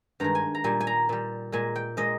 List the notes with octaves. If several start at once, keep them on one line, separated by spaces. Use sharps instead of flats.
G2 D#3 G#3 A#5
G#5
A#5
A#2 G3 G#5
G#5
A#5
A#2 G3
A#2 G#3 G#5
G5
A#2 G#3 D#5